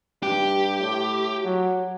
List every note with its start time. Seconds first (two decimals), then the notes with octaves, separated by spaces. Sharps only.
0.23 G2 G4
0.80 A2
1.45 F#3